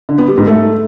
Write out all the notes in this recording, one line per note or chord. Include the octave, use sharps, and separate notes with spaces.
D3
B3
G3
G#2
A3